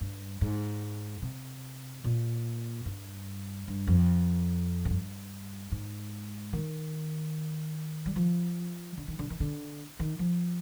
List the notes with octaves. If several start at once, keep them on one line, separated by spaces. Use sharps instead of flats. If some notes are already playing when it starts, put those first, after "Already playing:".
G2
G#2
C3
A#2
G2
G2
F2
G#2
G2
G#2
D#3
G3
F3
D3
D#3
D3
D#3
D3
D#3
F3